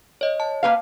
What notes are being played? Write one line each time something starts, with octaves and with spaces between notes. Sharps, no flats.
C#5 D#5
A5
A#3 B4 F5